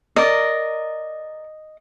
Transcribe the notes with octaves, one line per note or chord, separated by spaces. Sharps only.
A#4 D5 D#5